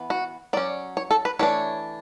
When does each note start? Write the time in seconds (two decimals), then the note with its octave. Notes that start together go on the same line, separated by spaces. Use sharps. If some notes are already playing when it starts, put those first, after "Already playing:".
Already playing: E3 B3
0.10 F#4
0.53 F#3 C#4 D5
0.97 C#5
1.11 A4
1.25 B4
1.39 E3 A3 D4 C#5